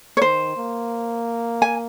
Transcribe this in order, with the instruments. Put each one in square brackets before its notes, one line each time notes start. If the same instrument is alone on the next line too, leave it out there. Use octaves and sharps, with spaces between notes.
[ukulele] C#5
[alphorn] D#3 [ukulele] C5
[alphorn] A#3
[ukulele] G#5